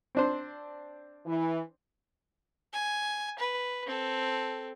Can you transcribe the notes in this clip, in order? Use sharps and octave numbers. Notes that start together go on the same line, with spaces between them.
C4 D4 C5
E3
G#5
B4
C4 A4